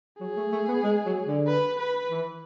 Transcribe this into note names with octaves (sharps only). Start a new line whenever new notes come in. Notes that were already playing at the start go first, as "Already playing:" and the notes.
F#3 G#4
A3
A3
B3
G#3
F#3
D3
B4
B4
E3